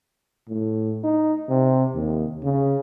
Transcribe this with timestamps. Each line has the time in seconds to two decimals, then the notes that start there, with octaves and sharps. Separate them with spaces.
0.49 A2
1.04 D#4
1.49 C3
1.95 D#2
2.43 C#3